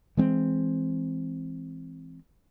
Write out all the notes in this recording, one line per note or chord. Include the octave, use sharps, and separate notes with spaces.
E3 G#3 C4